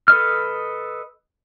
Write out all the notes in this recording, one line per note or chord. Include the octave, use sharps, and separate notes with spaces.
A4 B4 D#5 F6